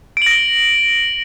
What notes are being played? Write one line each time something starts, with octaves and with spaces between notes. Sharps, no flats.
A#6 D7 F#7 G7